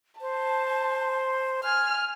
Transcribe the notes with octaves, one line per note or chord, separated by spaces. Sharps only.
C5 A5
G#5 F6